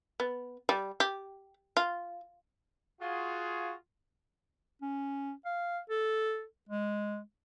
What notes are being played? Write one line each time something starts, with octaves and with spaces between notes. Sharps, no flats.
B3
G3
G4
F4
F4 F#4 G#4
C#4
F5
A4
G#3